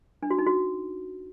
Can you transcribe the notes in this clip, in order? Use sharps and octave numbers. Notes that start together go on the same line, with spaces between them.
D4
F#4
D#4
F#4